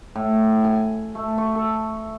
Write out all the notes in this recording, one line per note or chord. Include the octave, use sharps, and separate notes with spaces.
A2
G#5
A3
C#6
A4